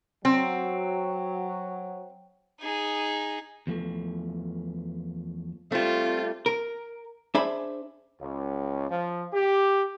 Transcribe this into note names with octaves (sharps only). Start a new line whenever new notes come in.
F#3 C4
D#4 G#4
E2 F3 A3
G3 A3 C4 F4 C5
A#4
D4 G#4 C5 E5 B5
C#2
F3
G4